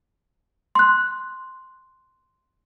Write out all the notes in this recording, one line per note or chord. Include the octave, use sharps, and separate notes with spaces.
C6 F#6